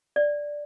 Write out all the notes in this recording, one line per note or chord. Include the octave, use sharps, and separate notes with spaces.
D5